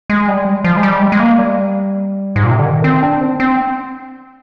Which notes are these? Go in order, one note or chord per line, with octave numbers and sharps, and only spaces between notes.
G#3
G3
F3
G#3
G3
G#3
G#3
A#3
G3
G#2
A#2
C3
D3
D#3
C4
D4
C4
C4